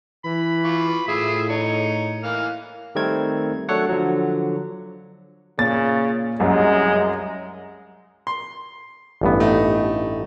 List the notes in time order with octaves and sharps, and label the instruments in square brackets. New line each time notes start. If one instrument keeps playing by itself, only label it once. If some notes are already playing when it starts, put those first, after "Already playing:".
[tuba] E3 [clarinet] B5
[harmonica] F4 C#6 D6
[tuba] A2 [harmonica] E4 F4 E6 [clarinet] G#4
[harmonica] D#4 [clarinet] C#5
[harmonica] E3 A#3 F6 [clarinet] F5
[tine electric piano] D#3 G3 A3 C4 A#4 G#6
F#3 A3 D4 A4 C#5 F#5
D3 F3 F#3
[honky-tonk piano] A#2 A6 [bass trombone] C#3
[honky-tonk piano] C2 F#2 [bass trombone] G#3
[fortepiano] C6
[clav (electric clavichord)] A1 G2 B3
[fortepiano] A3 D#4